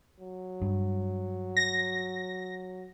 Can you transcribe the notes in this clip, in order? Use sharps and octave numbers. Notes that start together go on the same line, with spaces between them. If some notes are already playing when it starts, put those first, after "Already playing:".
F#3
G2
A#6